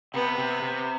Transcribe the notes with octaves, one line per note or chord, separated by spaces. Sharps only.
C3 B3
C3
C3